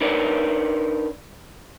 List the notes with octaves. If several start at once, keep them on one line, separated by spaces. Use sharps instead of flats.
D4 D#4 A#4 B4 C#5 D5